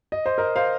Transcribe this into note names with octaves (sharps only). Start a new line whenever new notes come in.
D#5
C5
A#4 D#5
C5 F5